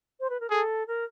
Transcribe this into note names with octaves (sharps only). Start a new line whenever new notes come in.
C5
B4
A#4
G#4 A4
A#4